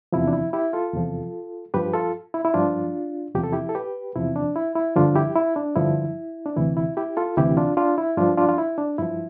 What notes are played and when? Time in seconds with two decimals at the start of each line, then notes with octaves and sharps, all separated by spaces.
0.13 E2 C3 F3 E4
0.28 D4
0.33 E4
0.53 E4 G4
0.73 F4 A4
0.93 E2 C3 F3
1.74 G2 F3 G4 B4
1.94 F4 A4
2.34 E4
2.45 E4
2.54 G2 F3 D4 F4
3.35 E2 C3 F3 G4
3.44 A4
3.52 E4 G4
3.69 A4
3.75 G4 B4
4.15 E2 C3 F3 E4
4.36 D4
4.56 E4
4.76 E4
4.96 G2 D3 F3 D4 F4
5.16 E4 G4
5.35 E4
5.56 D4
5.76 G2 D3 F3 E4
6.46 D4
6.56 D2 C3 E3 E4
6.77 E4
6.97 E4 G4
7.17 F4 A4
7.37 D2 C3 E3 E4 G4
7.57 D4 F4
7.77 D4 F4
7.98 E4
8.17 G2 F3 D4 F4
8.37 D4 F4
8.49 F4
8.58 E4
8.78 D4
8.98 G2 F3 E4